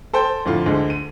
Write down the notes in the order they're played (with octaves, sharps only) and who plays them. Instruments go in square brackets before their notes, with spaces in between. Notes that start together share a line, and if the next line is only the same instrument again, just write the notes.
[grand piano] A4 C5 G5
F2 A2 D3 F4
D2 D3 G#3
D#7